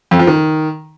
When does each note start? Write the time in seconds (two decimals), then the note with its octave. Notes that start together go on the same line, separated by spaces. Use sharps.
0.11 F2
0.19 F3
0.27 D#3